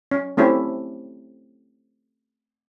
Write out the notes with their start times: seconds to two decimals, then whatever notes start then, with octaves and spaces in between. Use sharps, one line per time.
0.11 C#4
0.37 A3 C4 C#4 E4 G4